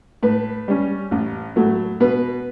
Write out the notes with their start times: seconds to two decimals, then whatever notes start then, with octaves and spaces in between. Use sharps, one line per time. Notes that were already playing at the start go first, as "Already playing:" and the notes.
0.23 A2 B4
0.68 G3 C#4
1.11 A1
1.56 A2 F#3 A3
2.00 B2 B4